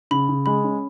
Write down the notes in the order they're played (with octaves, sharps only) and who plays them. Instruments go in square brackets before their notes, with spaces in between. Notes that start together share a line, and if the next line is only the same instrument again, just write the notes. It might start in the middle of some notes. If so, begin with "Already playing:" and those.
[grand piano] C#3 [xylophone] B5
[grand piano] C#3
[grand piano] G#3 [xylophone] B5
[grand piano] C#4